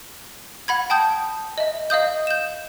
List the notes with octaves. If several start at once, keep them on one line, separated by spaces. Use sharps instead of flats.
F#5 B5 G#6
G5 A5 D#6 G6
D#5 E5
D#5 F5 D#6 G6
G6 E7